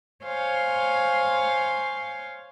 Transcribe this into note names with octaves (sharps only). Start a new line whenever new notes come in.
C5 C#5 F5 G#5 C6